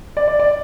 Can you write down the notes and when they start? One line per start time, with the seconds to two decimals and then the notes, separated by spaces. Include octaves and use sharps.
0.17 D5
0.28 D5
0.39 D5